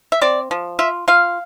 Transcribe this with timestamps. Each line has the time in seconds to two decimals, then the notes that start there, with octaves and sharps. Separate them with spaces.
0.12 E5
0.21 C4 D5
0.51 F3
0.79 F4 E5
1.08 F4 F5